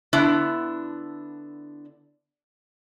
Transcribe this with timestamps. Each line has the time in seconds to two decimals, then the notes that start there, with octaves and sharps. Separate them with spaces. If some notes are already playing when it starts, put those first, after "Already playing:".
0.13 D3 B3 D4 E4